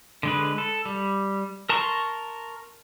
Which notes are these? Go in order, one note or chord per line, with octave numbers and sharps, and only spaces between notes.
D3 G#3 B4
A4
G3
A#4 A5 A#5 C6 C#6